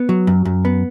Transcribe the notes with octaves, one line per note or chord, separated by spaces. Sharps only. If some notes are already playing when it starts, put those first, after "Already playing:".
Already playing: B3
F#3
F#2
F#2
B3